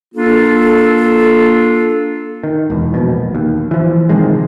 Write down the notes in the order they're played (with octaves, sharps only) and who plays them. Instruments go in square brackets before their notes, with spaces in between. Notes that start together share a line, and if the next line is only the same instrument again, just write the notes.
[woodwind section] A#3 D4 F4 A4
[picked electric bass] D#3
E1 E2
E1 A#1 B2
D#2
E3 F3
C3 D#3 F3 G#3